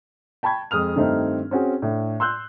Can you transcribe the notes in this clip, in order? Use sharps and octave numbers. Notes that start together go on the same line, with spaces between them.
G5 A5 B5 C#6 G#6
F2 G#3 D#6 F6 F7
G2 D#3 A3 C4 D#4
C4 C#4 F#4 G#4
A2 D4
C6 E6 F#6 G6